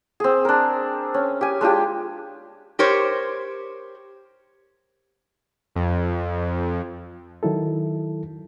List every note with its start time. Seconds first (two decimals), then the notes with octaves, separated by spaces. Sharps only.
0.20 C4 G#4
0.45 D4 A#4
1.14 C#4
1.41 G4 G#5
1.61 G#3 D4 F4 G4
2.79 G4 A#4 C5 C#5
5.75 F2
7.43 D#3 F#3 E4 A4